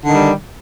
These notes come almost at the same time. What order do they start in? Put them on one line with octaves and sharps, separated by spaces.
D3 D#3 G3